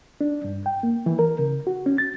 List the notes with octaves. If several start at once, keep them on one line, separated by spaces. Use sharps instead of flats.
D4
G2
G5
A#3
E3
A#4
C#3
F#4
C#4
A6